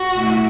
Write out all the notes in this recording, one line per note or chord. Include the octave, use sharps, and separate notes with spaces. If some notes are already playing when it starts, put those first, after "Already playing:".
Already playing: F#4
B2 A3 E4